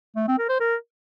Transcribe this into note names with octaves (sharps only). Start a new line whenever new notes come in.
A3
C4
A#4
C5
A#4